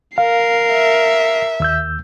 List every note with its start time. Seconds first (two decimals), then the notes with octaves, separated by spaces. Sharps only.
0.18 A#4 F5 C7
0.72 E5
1.60 D#2 E6 G6